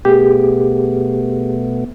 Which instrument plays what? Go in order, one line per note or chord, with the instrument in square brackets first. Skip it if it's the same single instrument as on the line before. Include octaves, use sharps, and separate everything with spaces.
[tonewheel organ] B2 A3 B3 [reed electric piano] G4 G#4